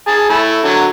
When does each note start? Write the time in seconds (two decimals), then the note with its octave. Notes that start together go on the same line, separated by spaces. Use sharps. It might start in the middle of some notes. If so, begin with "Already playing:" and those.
0.07 G#4 A5
0.29 A3 E4
0.64 D3 F#3